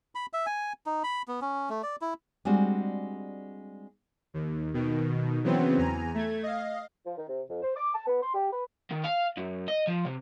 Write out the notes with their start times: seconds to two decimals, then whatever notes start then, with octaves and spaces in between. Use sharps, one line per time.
0.15 B5
0.33 E5
0.46 G#5
0.86 D#4
1.04 B5
1.28 B3
1.42 C#4
1.70 A3
1.83 D5
2.01 E4
2.45 G3 G#3 C4 D4 F#4
4.34 D#2
4.74 B2 D#3
5.44 C#3 E3 F#3 B3 C4
5.78 E2 G#5 A#5
6.14 A3 G#6
6.43 D#5 F5
7.05 F3
7.16 D#3
7.28 C3
7.49 F2
7.62 C5
7.75 D6
7.93 A5
8.06 B3
8.21 C6
8.33 G4
8.52 B4
8.91 D#3
9.04 F5
9.37 F#2
9.68 D#5
9.87 F3
10.05 C3